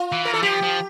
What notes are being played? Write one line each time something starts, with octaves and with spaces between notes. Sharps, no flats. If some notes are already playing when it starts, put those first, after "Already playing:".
Already playing: F4
E3
A#4
A4
F3 G4
F3